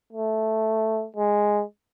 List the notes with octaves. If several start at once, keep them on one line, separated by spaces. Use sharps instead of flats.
A3
G#3